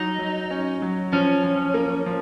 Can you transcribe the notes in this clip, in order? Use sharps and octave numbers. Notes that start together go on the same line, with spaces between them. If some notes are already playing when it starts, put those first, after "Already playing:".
Already playing: F#3 D#4
F#3
C#4
F#3
F3 C#4
F3
A#3
F3